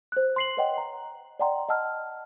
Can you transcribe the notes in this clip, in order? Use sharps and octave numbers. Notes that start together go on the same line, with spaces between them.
C5 F#6
C6 C7 F#7
B4 C#5 D#5 F#5 G5 C6
A#5
D5 D#5 F#5 G5 A#5 C6
D#5 F#5 A5 E6 F6